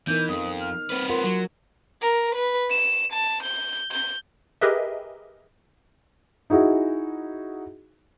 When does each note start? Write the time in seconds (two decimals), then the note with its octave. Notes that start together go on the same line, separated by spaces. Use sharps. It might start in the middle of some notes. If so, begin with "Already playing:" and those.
0.07 E3 B3 D#4 A#4 G6
0.29 F2 D#6
0.60 F6
0.90 C4 B4
1.10 F4 A#4 F#5 C6
1.24 F#3
2.02 A#4
2.35 B4
2.70 E7
3.13 A5
3.43 G6
3.91 G6
4.61 G4 G#4 A#4 B4 D#5 E5
6.50 D#4 E4 F#4 G#4